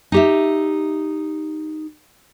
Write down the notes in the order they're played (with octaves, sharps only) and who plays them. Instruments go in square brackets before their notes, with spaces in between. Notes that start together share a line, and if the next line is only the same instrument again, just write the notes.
[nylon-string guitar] D#4 G4 E5